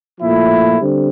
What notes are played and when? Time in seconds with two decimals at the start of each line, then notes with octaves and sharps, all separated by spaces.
0.20 A#2 F3 A3 E4
0.80 D3 G3 C4